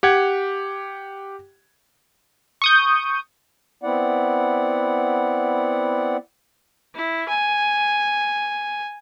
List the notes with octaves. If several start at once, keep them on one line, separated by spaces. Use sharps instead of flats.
G4 F#5 G#6
C#6 D#6 G6
B3 C4 E4 D5 F#5
E4
G#5